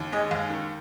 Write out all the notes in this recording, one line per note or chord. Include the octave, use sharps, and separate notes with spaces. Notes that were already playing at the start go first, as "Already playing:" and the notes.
Already playing: D#2
G#3 D#5
D#2 F5
D#3